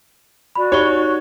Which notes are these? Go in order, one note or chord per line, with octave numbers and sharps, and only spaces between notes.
F#4 D5 B5
D#4 G4 C#5 G7